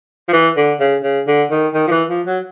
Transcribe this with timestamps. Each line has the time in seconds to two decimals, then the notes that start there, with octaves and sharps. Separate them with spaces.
0.29 F3
0.33 E3
0.57 D3
0.80 C#3
1.03 C#3
1.27 D3
1.51 D#3
1.74 D#3
1.87 F3
1.91 E3
2.09 F3
2.27 F#3